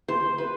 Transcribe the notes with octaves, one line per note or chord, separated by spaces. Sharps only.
C5
B4